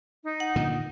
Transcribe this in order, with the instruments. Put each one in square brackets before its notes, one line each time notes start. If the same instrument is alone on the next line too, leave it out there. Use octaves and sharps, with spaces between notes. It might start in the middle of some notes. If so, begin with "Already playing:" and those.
[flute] D#4
[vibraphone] F#5
[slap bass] A#2 D3 D#3